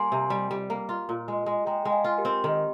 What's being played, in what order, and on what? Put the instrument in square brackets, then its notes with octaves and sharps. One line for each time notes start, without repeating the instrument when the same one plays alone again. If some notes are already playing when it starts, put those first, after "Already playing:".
Already playing: [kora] G3 A#3 [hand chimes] G#5 C6
[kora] C3
G3
G3
A#3
F4
A#2
G#3
G#3
[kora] G#3 [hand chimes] G5 A#5
[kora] G#3
[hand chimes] F5 G#5
[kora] F4
[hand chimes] G4 A#4
[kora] C4
[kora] D#3 [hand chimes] G4